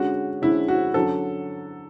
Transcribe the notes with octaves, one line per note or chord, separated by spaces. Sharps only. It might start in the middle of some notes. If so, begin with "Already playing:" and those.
Already playing: D3 G#3 C#4 F#4
D3 G#3 C#4 E4
F#4
D3 F#3 C#4 A4